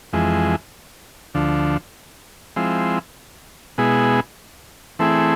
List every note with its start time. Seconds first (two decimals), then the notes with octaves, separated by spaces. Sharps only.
0.13 F2 E3 G#3
1.35 D2 D3 F3
2.56 F3 G#3 C4 E4
3.78 B2 G#3 B3 E4 G#4
4.99 E3 A3 C4 E4 G#4